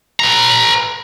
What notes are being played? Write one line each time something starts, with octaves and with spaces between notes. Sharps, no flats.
B4 A#5